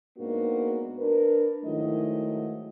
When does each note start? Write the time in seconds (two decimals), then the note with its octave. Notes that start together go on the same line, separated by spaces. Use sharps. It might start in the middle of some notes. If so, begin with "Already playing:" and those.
0.18 G#2 A#3 B3 D4 D#4 F#4
0.98 D4 A#4 B4
1.64 G#2 D#3 F#3 A3 E4 D#5